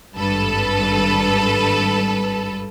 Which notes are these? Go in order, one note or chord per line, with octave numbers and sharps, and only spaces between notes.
G#1 G2 A4 B4